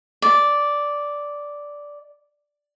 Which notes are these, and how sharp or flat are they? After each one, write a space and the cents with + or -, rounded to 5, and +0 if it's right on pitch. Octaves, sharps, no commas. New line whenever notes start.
D5 -5